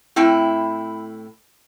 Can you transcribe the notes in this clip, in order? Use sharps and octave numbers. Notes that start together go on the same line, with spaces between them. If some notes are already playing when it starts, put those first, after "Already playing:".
A2 C4 E4 G5